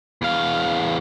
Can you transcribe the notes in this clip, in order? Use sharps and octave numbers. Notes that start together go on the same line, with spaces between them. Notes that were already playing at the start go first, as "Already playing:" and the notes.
E2 F5